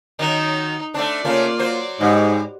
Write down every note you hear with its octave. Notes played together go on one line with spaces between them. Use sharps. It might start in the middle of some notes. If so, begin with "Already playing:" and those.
D#3 F#3 D#4
A3 C4 D4 D5
C#3 A3 A#3 C#4 F4
F#3 C5
G#2 G3